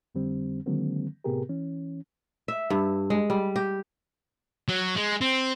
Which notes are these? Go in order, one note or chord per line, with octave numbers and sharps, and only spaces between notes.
F2 D3 G3 C4
D3 D#3 F#3 G#3 A#3 C4
A2 C3 B3 G4 G#4 A#4
E3 C#4
E5
G2
G#3
G3
G4
F#3
G#3
C4